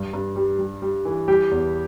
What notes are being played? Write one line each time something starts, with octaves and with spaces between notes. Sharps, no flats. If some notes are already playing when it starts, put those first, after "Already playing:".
Already playing: G2 G3
G2
G3
G3
G3
E3
G3 G4
E2